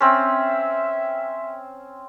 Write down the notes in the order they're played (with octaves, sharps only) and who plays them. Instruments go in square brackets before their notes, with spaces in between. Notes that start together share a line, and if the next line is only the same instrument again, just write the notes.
[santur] C4 C#4 [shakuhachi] E5